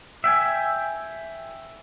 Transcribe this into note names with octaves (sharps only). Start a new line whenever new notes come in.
E5 G5 G#5